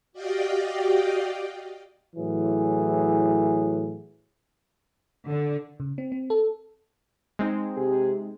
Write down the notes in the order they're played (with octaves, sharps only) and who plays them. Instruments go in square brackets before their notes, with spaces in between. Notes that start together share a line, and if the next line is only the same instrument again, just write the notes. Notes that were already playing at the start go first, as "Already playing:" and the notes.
[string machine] F#4 G4 D5 D#5 F5 G5
[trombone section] A2 E3 F#3 G#4
[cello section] D3
[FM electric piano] C#3
C4
C4
A4
[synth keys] G#3 C4 D#4
[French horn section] C3 G4 G#4